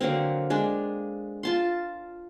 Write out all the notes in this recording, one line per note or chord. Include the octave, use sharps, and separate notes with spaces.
D3 F#3 A#3 C4
G#3 D4
F4 A5 C6